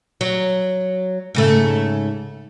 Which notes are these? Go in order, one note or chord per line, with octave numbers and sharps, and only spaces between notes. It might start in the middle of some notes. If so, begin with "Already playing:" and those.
F#3
G#2 C#3 A3